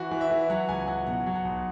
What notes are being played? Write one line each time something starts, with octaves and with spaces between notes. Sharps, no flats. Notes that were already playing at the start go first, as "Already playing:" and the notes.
Already playing: E3 F#4
E3
E5
E3
F#3 F#5
C#2 G#5
F#3 F#5
B2 F#5
F#3
F#5
B1